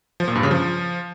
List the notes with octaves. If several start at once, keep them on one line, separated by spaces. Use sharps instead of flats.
F3
A#2
G2
C#3
F3